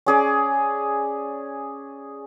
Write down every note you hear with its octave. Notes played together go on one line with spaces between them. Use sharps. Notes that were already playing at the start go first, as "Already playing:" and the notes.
C#4 G#4 D5